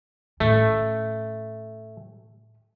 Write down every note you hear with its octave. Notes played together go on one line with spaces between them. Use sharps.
A2 A3 C#4